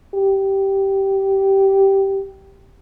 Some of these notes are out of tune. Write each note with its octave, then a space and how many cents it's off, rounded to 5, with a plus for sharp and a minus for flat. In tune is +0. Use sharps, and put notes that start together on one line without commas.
G4 -10